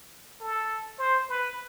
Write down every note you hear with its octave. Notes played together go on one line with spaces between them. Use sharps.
A4
C5
B4